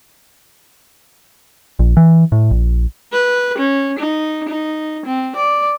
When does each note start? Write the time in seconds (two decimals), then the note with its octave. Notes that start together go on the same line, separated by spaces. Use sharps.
1.79 A#1
1.97 E3
2.32 A2
2.51 A#1
3.13 B4
3.58 C#4
3.99 D#4
4.49 D#4
5.06 C4
5.36 D5